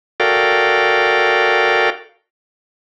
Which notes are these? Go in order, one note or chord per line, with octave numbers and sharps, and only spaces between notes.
F#4 A4 A#4 D5 F5 G5